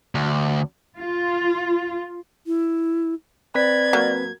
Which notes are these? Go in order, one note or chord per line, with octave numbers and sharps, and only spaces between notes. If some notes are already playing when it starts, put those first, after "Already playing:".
D2
F4
E4
C4 B4 D5 G#6 B6
F#3 A#3